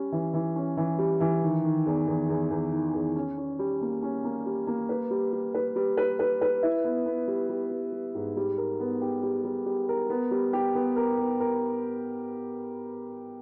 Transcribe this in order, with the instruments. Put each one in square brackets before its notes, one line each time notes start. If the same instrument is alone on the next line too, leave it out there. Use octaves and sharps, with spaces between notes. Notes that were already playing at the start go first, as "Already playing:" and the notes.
Already playing: [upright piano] G3 C#4
E3
E3
C#4
E3
G3
E3
D#3
D#3
E2
E2
E2
E2
D#3
E2
C#4
C#4
G3
A#3
C#4
A#3
G3
A#3
B4
G3
G3
B4
G3
B4
B4
B4
E4
B3
B3
G3
G3
G3
G3
G#2
G3
A#4
B3
G4
G3
G3
G3
A#4
B3
G3
G4
B3
A#4
B3
A#4